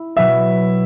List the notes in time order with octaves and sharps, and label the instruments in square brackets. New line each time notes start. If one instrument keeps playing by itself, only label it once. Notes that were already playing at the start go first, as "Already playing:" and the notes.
Already playing: [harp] E4
[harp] B2 F#3 B3 [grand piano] E5